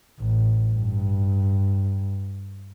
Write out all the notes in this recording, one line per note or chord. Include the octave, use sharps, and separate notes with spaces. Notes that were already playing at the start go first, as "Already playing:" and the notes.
A1
G2